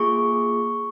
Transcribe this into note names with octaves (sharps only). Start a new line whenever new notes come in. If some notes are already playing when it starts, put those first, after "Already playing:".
Already playing: A#3 F4 G#4 C#6